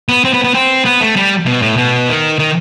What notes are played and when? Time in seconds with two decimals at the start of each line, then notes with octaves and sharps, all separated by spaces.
0.09 B3
0.24 C4
0.34 B3
0.44 B3
0.55 C4
0.85 B3
1.01 A3
1.16 G3
1.46 B2
1.62 A2
1.77 B2
2.08 D#3
2.39 D#3